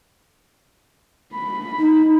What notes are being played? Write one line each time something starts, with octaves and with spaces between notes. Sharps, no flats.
B5
D#4